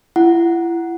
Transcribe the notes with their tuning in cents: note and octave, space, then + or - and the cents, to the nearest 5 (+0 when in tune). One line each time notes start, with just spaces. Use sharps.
E4 +35 F#5 +0